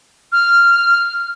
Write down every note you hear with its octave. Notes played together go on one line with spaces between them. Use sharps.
F6